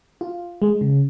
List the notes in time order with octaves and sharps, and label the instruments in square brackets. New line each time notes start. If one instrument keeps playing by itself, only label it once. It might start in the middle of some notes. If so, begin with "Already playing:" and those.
[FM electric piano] F4
G#3
C#3